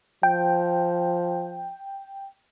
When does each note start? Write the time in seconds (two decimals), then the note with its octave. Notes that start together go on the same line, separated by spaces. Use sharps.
0.23 F3 G5